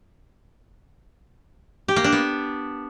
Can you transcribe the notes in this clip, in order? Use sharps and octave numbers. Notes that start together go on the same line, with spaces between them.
G4
A#3
D4
B3